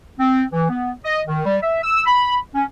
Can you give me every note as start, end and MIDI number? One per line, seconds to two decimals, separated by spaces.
0.19 0.43 60
0.51 0.69 52
0.69 0.91 59
1.04 1.20 75
1.27 1.41 51
1.45 1.56 55
1.62 1.82 76
1.82 2.02 88
2.06 2.36 83
2.54 2.64 61